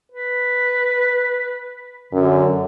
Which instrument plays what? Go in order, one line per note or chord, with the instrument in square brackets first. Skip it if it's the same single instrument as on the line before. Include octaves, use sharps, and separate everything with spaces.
[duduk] B4
[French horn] F#2 [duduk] D3